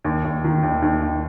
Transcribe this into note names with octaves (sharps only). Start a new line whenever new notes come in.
D#2
D#2
D#3
D#2
D#2
D#2